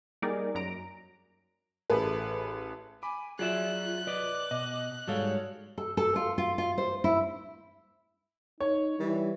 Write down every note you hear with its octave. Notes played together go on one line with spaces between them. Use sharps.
G3 A#3 D#4 G#4 A#4 D5
F#2 A#5 D7
A1 A3 G#4 A4 B4
G#5 B5 D6
F#3 F4 G#4 D5 E5 F#6
B4 D5 D#5 D6
B2 D#5
G#2 G3 G#3 F#4 A4 C#5 F5
A4
A4
F4
F4
F4
C5
E4
D#4 C#5
E3 G3